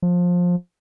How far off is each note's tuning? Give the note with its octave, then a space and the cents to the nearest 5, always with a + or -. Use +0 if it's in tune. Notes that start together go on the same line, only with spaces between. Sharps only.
F3 +20